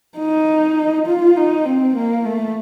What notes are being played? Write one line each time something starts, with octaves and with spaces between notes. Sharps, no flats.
D#4
F4
D#4
C4
A#3
A3